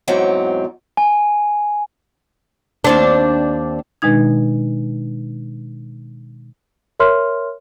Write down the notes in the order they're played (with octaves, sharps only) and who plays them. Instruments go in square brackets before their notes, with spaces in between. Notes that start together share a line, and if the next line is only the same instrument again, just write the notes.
[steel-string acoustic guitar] E2 G#2 F#3 C4
[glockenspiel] G#5
[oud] D#2 C4 D4
[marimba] B2 D#3 G#3 D4 D#4 G#6
[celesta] A#4 C#5 E5 C6 F6